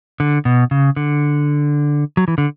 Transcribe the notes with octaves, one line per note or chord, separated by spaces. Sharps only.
D3
B2
C#3
D3
F#3
E3
D3